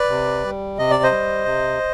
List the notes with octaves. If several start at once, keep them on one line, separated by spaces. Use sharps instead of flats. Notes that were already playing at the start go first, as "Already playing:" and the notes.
Already playing: B4 D5
C3
G3
C3 D#5
D5
C5 D#5
G3
C3